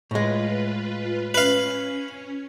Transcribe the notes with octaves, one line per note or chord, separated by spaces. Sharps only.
A2 G#3 F4 B4
C#4 B4 F5